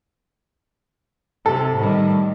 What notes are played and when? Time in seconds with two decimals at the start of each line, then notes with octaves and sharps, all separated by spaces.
1.46 C3 A4
1.76 A2 D#3 G3